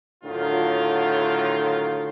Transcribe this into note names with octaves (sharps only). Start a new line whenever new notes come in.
A2 D3 D#3 F#3 F4